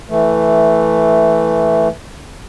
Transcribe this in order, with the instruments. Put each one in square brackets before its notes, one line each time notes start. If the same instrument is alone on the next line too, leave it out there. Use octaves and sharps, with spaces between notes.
[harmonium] E3 A3